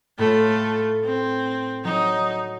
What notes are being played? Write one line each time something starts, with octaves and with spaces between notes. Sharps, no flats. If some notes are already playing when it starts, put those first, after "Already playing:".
A2 A3 F4
C4
F#3 D#4